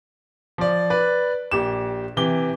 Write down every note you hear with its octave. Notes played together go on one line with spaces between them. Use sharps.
F3 D5
B4 D5
A#1 G4 E7
C3 E3 G4 G7